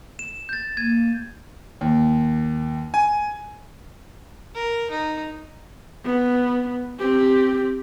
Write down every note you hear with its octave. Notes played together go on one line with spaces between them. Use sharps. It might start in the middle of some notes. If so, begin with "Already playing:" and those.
E7
G6 A6
A#3 G#6 D#7
D#2
G#5
A#4
D#4
B3
C4 G4